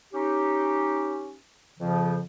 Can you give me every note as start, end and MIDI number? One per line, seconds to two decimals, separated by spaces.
0.13 1.36 61
0.13 1.36 63
0.13 1.36 67
1.79 2.20 41
1.79 2.20 49
1.79 2.20 53